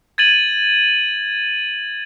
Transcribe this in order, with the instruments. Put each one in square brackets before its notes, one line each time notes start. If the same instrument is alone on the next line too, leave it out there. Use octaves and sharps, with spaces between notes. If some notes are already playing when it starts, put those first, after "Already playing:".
[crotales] G#6 A6 D#7 F#7